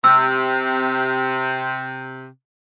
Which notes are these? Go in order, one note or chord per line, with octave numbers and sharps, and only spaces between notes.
C3 E6